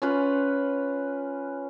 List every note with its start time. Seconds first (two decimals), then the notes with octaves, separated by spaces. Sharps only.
0.02 C#4 F4 B4